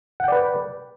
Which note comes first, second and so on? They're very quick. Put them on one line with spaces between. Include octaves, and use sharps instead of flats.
F#5 G5 D5 B4